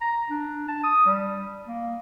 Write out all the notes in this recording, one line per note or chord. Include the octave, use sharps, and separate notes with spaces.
A#5
D4
A5
D#6
G3
A#3